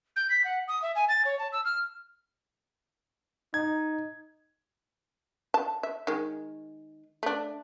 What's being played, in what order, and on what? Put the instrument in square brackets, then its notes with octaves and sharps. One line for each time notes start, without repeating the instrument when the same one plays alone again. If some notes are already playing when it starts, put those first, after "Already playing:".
[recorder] G6
B6
F#5
D#6
E5
G#5
A6
C#5
A5
E6
F6
[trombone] D#4 [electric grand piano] G#6
[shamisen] A5
E5
D#3 G#3
A3 D4